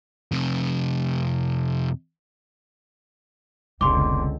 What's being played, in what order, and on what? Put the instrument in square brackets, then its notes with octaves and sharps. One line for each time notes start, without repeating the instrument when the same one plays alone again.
[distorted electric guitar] F2 C3
[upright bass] F1 B3 [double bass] C#2 D3 [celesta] C6 D6